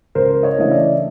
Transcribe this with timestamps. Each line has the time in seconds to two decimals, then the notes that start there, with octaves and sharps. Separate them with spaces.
0.15 C#2 A#4 C5
0.43 C#5 D#5
0.58 C#3 E3 A3 D4 D#5
0.72 D5 E5